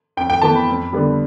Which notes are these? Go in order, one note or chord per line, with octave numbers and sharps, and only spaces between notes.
F2 G5
G5
E3 B3 A5
B5
F2
D3 G3 B3